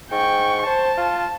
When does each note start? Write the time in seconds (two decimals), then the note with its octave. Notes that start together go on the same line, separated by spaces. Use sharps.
0.11 G#2 G5 C#6
0.67 C5 A5
0.98 F4